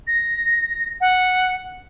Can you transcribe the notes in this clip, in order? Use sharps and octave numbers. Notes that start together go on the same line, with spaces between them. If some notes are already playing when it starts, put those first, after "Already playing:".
A#6
F#5